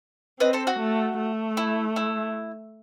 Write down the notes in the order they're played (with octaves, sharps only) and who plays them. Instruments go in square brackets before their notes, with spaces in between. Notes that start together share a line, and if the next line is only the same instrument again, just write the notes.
[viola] C4 [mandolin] B4 D#5
[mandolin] A4 C5
F#4
[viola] A3
A3
[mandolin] E4
E4